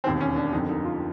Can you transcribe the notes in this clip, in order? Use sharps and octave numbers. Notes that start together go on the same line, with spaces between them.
E1 D#2 D#3 C4
C#4
D4
F#1 F2 D3 D#4
D#4
F4